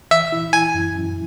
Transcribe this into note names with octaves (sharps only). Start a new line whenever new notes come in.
E3 E5
E4
E4 G#5
F#2
F#2